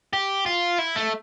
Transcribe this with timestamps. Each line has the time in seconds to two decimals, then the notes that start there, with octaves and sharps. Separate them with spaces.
0.13 G4
0.46 F4
0.79 E4
0.96 A3